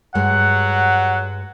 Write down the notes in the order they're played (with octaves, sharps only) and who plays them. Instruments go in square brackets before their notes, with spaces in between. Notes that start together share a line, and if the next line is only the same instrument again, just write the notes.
[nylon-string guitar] G2 G#3 [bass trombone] F#3 [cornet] F#5